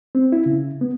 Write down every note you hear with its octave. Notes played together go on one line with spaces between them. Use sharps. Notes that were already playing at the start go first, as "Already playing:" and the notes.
C4
E4
C#3
B3